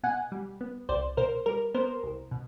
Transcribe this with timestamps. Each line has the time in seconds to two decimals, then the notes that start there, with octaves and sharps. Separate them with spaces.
0.03 B2 F#5 G#5
0.32 G3
0.61 B3
0.89 C2 C5 D5
1.17 B2 A#4 C5
1.46 G3 A#4
1.74 B3 A#4 C5
2.03 C2
2.31 B2